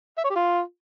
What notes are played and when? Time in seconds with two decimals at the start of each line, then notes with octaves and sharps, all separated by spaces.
0.18 E5
0.24 C#5
0.30 G4
0.36 F4